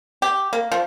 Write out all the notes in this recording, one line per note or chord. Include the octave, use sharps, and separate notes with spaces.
G4
A#3
F3